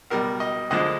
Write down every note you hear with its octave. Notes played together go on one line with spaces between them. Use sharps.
C#2 B2 G3 A#4
D#5
D2 D3 F3 G#3 D#5